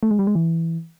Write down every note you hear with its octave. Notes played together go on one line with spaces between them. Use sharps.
A3
G#3
G3
G#3
E3